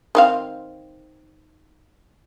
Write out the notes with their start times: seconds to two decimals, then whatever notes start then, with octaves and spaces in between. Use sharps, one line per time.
0.15 D#3 C4 F5